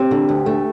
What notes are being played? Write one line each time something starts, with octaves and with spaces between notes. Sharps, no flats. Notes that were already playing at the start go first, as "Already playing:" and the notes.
Already playing: C4 G4 G5
D3
D2
A3